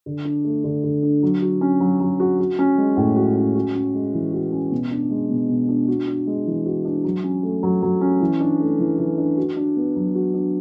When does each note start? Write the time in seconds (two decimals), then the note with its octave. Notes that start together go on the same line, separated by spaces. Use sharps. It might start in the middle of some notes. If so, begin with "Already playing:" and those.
0.06 D3
0.25 D4
0.45 A3
0.64 D3
0.84 D3
1.03 D4
1.23 F#3
1.42 F#4
1.61 C#4
1.80 F#3
2.00 F#3
2.20 F#4
2.39 F#4
2.59 C#4
2.78 G#3
2.97 A2
3.16 F#4
3.36 C#4
3.55 F#4
3.75 C#4
3.94 G#3
4.13 E3
4.33 F#4
4.52 C#4
4.72 B2
4.91 D4
5.11 G#3
5.30 B2
5.49 B2
5.68 D4
5.88 F#4
6.07 D4
6.27 G#3
6.46 E3
6.66 F#4
6.85 D4
7.04 F#3
7.24 C#4
7.43 A3
7.63 F#3
7.82 F#3
8.01 C#4
8.21 E3
8.40 D4
8.60 A3
8.79 E3
8.98 E3
9.18 D4
9.38 F#4
9.57 D4
9.76 B3
9.96 F#3
10.15 F#4
10.34 D4